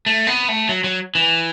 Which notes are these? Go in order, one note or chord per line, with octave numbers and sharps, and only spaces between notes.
A3
B3
A3
F#3
F#3
E3